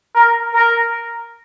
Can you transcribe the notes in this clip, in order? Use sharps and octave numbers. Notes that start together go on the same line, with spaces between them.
A#4
A#4